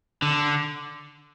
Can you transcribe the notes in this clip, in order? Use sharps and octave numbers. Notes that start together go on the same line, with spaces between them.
D3